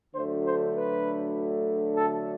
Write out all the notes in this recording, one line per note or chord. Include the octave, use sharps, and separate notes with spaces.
D2 D3 F#3 A3 C5
C5
B4
A4